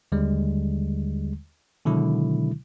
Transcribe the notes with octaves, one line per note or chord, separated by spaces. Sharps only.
D#2 D3 G3 G#3
B2 D3 D#3 F#3 G#3 E4